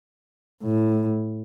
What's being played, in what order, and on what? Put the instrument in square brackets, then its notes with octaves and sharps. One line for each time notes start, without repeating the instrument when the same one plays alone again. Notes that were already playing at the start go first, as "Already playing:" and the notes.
[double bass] A2